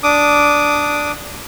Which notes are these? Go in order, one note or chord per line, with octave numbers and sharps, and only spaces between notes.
D4 D6 D#6